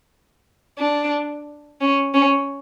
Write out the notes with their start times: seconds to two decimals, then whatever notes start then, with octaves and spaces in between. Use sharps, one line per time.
0.78 D4
1.81 C#4
2.14 C#4